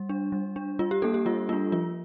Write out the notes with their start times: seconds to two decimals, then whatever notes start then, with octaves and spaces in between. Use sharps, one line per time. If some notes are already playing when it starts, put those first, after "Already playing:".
Already playing: G3
0.09 D4
0.32 G3
0.56 D4
0.79 G3 F4
0.91 G4
1.02 A#3 D4 A4
1.14 G4
1.26 G3 F4
1.49 A#3 F4
1.53 D4
1.72 F3 F4